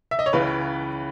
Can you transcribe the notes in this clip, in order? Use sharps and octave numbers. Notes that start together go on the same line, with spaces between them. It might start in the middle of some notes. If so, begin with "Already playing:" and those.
E5
D#5
C#5
C#2 C#3 E3 B4